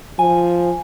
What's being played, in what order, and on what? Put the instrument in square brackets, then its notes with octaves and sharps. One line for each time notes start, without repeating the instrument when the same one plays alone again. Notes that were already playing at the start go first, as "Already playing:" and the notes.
[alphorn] F3 [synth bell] G#5